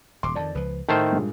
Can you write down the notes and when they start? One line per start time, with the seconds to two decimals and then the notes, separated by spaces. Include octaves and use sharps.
0.23 D#1 C6 D6
0.35 F2 D3 D#3 D5 A5
0.55 C#2 F3 B4
0.89 A2 D#3 A3 C5 A5
1.13 G2 A#2 G#3